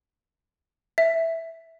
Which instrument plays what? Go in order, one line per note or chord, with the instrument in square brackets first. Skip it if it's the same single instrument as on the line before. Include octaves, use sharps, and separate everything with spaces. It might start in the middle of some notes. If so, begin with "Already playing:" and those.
[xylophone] E5